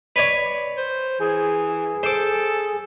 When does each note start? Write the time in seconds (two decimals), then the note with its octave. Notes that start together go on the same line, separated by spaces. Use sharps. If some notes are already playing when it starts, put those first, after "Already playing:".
0.16 B4 C#5 D5
0.78 C5
1.20 E3 G#4
2.03 A4 C5 D6